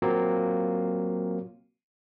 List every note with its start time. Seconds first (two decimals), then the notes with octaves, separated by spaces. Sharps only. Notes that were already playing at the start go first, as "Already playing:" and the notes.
0.02 F#3 A#3 C4 F4